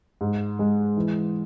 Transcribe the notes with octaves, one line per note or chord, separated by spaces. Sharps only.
G#2
G#3
E3